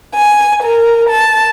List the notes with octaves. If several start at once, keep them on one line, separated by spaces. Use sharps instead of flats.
G#5
A#4
A5